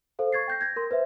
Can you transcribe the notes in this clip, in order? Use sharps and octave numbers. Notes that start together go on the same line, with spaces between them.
A4 C5 F5
C#6 G#6 A6 C7
G5 G6 A#6
G#6 A#6
A#4 C6
B4 C5 E5